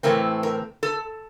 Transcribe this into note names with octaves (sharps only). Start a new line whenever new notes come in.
A2 E3 A3 C4 A#4
A#4
A4